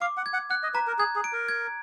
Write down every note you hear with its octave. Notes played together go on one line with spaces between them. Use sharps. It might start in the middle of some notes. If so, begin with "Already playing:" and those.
F5 D6
F#5
G#6
F#5
F#5 F#6
D#5
B4 A#5
A#4
G#4 G#6
G#4
D7
A#4
G#6